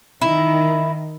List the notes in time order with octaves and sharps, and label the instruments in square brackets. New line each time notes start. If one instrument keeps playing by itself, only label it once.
[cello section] D#3 [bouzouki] E4